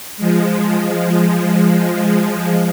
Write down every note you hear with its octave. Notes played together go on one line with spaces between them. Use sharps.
F3 G#3